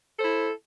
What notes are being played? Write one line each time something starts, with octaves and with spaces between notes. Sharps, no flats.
E4 A4 C5